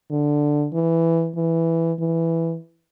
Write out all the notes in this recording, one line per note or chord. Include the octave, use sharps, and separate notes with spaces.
D3
E3
E3
E3